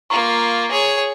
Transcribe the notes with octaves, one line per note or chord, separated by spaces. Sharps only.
A#3 F4 A#5 C#6
G#4 C#5